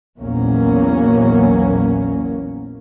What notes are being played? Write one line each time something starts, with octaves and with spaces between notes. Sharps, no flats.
A#1 E2 F#3 A#3 C#4